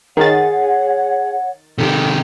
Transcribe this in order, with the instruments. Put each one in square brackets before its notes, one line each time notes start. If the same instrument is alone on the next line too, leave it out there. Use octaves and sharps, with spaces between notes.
[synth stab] D#3 A6 [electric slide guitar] G#4 [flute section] C#5 F#5
[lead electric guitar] C3 D#3 [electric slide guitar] G4 A4